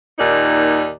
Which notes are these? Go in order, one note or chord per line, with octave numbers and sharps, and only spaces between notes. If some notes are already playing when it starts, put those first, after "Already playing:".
D#2 A#2 D#4 D5